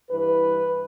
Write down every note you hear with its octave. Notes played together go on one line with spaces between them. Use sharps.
G2 E3 B4